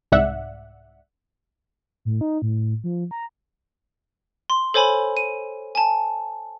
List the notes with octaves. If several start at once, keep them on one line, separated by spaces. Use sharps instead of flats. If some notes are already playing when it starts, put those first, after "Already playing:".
C2 G#2 D5 E5 F#5
A2
D#4
A2
F3
A#5
C6
A4 C5 C#5 G#5 B5
D#7
G#5 A5